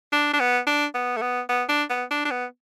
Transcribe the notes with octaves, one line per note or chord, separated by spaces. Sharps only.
D4
D4
B3
D4
B3
A3
B3
B3
D4
B3
D4
D4
B3